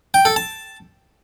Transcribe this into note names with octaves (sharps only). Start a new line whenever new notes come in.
G5
A4
A5